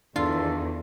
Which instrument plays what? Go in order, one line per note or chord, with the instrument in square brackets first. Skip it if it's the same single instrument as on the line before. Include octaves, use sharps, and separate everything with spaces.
[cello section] E2 D#3 [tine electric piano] D4 [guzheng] F4 [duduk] A4